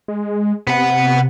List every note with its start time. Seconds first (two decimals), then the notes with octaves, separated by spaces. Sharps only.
0.08 G#3
0.67 C3 B3 F#5